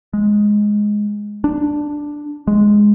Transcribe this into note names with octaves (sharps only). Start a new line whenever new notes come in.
G#3
D4
G#3